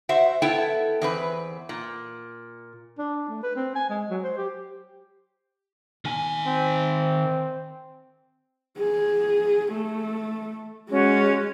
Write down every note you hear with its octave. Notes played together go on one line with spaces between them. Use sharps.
F#4 C5 E5
B3 E4 A4 G5
E2 C4 B4
A#2
D4
A3
B4
C4
G#5
G#3
F#3
C5
G4
D#3 G#5
C4
G#4
A3
G#3 C#4 F#4